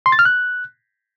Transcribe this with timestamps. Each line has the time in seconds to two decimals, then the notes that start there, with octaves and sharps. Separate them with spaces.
0.06 C6
0.12 A6
0.19 F6
0.25 F#6